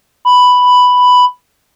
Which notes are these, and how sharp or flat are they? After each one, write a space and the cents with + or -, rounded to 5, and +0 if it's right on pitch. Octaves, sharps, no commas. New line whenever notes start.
B5 +5